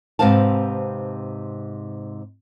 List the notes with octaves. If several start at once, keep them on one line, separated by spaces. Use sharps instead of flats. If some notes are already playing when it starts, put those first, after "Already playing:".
G#2 C3 C4 B4 F5 A5